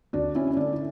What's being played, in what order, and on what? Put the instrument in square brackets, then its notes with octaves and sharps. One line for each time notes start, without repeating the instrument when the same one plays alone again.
[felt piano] D2 D4 F#4
C#4 E4
C#4
D3 A3 D4
E4